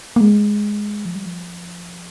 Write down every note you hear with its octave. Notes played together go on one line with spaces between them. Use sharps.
A#3
G#3
F3
G3
F3